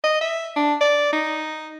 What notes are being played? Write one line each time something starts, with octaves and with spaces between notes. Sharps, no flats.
D#5
E5
D4
D5
D#4